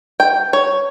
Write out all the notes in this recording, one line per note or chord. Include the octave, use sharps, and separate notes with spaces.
G5
C#5